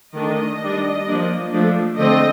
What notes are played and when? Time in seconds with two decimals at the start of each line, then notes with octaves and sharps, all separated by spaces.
0.15 D#3 A3 D4 D#5
0.62 G3 D4
1.08 F3 A#3 D4
1.53 F3 A3 D4
1.98 D3 A3 C4 D#5